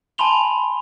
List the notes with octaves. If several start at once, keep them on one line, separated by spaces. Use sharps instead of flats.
G#5 A5 B5 C6 F7 G7